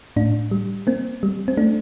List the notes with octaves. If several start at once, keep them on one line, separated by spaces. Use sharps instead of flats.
A2 D4
G3
A#3 C4
G3
C4
A3 D4